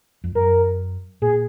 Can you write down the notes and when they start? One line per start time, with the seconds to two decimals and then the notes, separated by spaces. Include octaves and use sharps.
0.24 F2
0.35 F#2 A#4
1.22 A#2 G#4